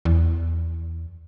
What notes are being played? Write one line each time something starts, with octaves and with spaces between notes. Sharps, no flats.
E2